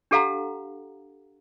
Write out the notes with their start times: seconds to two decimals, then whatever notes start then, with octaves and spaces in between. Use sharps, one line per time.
0.11 D4 G4 A4 F5 F#5 A#5